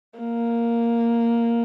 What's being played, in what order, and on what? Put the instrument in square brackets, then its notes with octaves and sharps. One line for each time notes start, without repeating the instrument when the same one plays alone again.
[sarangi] A#3